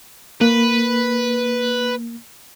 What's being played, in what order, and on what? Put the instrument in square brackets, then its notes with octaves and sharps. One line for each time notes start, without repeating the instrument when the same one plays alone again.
[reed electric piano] A#3 [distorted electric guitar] B4